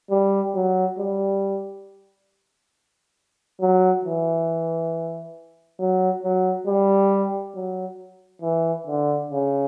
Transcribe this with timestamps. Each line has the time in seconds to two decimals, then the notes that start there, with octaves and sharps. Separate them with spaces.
0.10 G3
0.55 F#3
0.98 G3
3.61 F#3
4.05 E3
5.79 F#3
6.23 F#3
6.67 G3
7.55 F#3
8.42 E3
8.86 D3
9.29 C#3